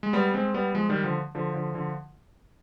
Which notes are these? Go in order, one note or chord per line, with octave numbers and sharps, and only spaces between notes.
G#3
G3 B3
G#3 C4
G3 B3
F3 G#3
D#3 G3
D3 F3
D3 F3
D3 F3
D3 F3